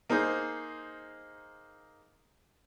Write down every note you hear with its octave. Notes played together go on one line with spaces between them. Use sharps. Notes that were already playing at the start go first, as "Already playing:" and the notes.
A#3 D#4 G#4 C5